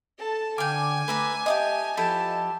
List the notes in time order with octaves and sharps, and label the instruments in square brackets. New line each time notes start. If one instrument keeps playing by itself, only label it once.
[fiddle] A4 A5
[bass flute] D3 [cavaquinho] F5 G5 [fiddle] G#5 [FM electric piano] D6
[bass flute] A3 [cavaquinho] B4 E5 A#5
[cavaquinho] G4 A5 D#6 [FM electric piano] D#5 [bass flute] E5
[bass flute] F3 [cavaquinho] E4 G4 A4 [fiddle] A5